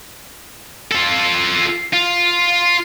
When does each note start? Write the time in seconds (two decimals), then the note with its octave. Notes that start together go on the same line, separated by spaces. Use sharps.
0.92 F4 A4
1.93 F4